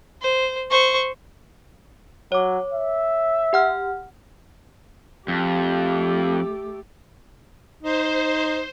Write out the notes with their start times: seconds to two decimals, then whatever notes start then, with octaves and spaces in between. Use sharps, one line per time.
0.22 C5
0.71 C5 C#6
2.32 F#3 C#5 D6
2.73 E5
3.53 G4 F#5 F6
5.28 F2 A3 G4
7.83 D#4 C5